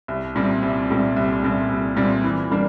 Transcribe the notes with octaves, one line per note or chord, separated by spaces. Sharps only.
C2
A#2 G3 C4
C2
A#2 G3 C4
C2
A#2 G3 C4
C2
A#2 G3 C4
E3
G3 A#3 D4